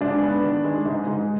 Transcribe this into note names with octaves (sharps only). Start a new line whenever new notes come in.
G#2 D4
B3
D#3
G#3
G#2 D#4
G#2